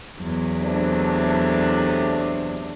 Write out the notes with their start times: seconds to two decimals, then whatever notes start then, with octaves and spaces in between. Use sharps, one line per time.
0.21 E2 F#3
0.63 C3 A3 D4